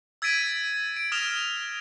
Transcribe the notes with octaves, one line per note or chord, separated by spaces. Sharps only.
E6 G#6 A6 B6 D7 D#7
D7
D#6 F6 A#6 E7 F7 G7